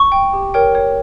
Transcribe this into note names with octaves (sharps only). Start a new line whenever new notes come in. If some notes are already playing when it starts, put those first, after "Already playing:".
Already playing: C#6
G5
G4
A#4 C#5 G5
C#5